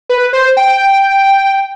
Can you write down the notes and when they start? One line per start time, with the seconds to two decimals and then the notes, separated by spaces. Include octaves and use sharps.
0.09 B4
0.33 C5
0.57 G5